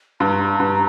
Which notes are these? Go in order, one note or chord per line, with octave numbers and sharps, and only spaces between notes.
G2 A#5
G2